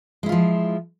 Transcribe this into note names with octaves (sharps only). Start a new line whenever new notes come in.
F3 G#3 E4 F4